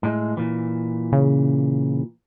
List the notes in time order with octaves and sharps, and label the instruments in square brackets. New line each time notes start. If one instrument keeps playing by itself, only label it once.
[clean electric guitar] A2 G#3
A#2 E3
[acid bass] C#3